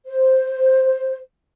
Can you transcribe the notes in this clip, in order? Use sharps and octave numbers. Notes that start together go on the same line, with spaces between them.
C5